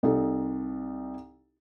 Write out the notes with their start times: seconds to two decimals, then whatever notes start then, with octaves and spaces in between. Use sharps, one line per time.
0.03 C2 D#4 A4